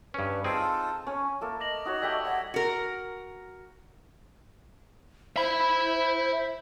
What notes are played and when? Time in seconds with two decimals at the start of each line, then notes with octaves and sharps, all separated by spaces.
0.14 G2 C#4 B4
0.44 C4 D#4 F4 G#4 A4 A5
1.07 C#4 G#5
1.41 A3 A#3 A4
1.60 D#5 D6 A#6 F#7
1.85 D#4 F#4 C#5
2.02 G3 A3 G5 E6 G#6 B6
2.25 C#5 F#5
2.54 F#4 A#4
5.36 C5 E5 B5